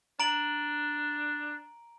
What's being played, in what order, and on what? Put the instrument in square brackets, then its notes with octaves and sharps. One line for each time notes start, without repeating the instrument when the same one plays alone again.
[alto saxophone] D4 [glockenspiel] A#5 D7 F#7